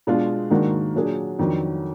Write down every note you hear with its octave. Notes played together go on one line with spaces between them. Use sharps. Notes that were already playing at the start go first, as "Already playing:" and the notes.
B2 G#3 D4 F4
G#2 D#3 A#3 D4 F#4
A#2 F#3 D4 G#4
F2 D#3 F#3 D4